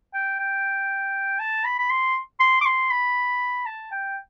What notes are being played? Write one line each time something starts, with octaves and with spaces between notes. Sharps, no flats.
G5
G5
A5
B5
B5
C6
C6
D6
C6
B5
A5
G5